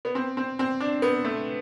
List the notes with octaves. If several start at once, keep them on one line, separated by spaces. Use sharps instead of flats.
B3
C4
C4
C4
D4
B3
A3